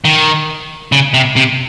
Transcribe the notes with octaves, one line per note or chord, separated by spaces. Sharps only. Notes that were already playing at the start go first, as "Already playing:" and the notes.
D#3
C#3
C3
C3